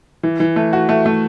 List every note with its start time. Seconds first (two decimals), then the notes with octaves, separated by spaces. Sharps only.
0.23 E3
0.40 E3
0.56 A3
0.73 F#4
0.89 A3
1.06 A3